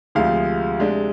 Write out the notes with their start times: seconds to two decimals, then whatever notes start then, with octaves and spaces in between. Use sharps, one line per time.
0.15 D2 C3 F3 G#3 F5
0.78 C3 G#3 D4